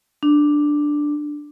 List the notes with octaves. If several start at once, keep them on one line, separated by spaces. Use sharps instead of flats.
D4